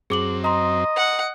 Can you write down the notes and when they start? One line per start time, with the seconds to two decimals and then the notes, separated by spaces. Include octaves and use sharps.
0.10 F#2 C4 G#4 D6 F#7
0.44 D#5 A#5 C6
0.96 F#5